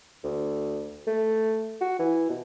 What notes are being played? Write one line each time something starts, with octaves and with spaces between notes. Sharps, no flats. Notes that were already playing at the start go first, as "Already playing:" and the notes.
D2
A3
F#4
E3
B2